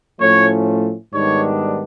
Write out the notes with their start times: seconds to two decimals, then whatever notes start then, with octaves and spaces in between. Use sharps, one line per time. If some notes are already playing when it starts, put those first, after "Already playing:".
0.20 A2 F3 A3 C#4 C#5
1.12 G#2 D#3 G3 B3 D4 C#5